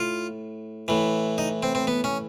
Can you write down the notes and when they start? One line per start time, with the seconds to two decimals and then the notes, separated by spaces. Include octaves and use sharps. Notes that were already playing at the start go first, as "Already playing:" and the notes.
Already playing: A2 F4
0.88 A2 E3
1.38 D#4
1.63 C4
1.75 C4
1.87 B3
2.04 C#4